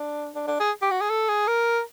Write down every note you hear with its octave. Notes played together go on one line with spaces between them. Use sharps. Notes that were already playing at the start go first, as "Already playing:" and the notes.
Already playing: D4
D4
D4
G#4
G4
F#4
G#4
A4
G#4
A#4